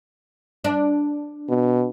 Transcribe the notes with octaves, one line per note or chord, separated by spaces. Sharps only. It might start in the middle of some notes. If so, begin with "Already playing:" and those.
D4
B2